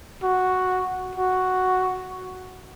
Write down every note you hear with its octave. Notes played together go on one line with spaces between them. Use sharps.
F#4
F#4